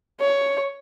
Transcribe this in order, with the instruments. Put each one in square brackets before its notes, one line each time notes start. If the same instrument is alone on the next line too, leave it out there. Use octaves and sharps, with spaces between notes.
[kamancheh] C#5